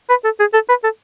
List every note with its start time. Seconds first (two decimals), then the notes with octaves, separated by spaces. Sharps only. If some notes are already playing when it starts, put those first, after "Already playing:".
0.10 B4
0.24 A4
0.40 G#4
0.53 A4
0.69 B4
0.84 A4